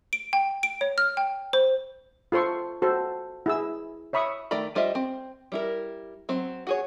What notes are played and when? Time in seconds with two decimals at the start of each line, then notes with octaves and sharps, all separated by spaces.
0.13 D7
0.33 G5
0.63 D7
0.81 C#5
0.98 F6
1.17 G5
1.53 C5
2.32 F4 A4 C5 C6 C#6
2.82 F#4 A4 C5
3.46 E4 G#4 E6
4.13 C#5 E5 B5 C#6 D#6
4.51 D#3 A3 D5 A#5 B5
4.75 G3 F4 C5 D#5 E5
4.95 C4
5.52 G3 E4 A#4
6.29 F#3 C4
6.67 F#4 G#4 C#5